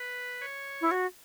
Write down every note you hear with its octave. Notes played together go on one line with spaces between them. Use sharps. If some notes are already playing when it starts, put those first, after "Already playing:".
Already playing: B4
C#5
E4
F#4